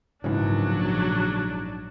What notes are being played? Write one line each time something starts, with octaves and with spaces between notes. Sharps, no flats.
A#1 G#2 C#3 E3 F#3 D4